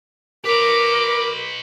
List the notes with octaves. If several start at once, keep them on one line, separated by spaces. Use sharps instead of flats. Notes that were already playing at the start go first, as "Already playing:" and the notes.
A#4 B4 C#5 D6